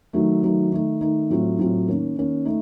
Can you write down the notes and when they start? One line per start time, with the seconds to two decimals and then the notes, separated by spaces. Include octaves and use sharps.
0.13 D#3 F#3 A3
0.43 D#3 F#3 A3
0.72 D#3 A3 D#4
1.01 D#3 A3 D#4
1.30 A2 F#3 A3 C4 F4
1.59 A2 F#3 A3 C4 F4
1.87 D#3 A#3 C#4
2.16 D#3 A#3 C#4
2.45 A3 D#4